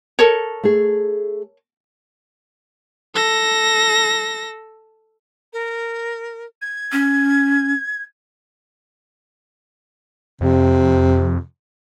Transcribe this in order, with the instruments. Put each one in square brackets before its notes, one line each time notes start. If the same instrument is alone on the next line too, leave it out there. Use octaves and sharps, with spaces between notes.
[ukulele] A4 A#4 C#5
[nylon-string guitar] A3 G#4
[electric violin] A4 A#6
[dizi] A#4
G#6
[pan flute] C#4
[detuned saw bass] F2 [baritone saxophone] C3